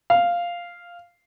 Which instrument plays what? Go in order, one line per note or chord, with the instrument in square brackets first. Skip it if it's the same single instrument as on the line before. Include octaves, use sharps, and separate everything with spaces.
[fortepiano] F5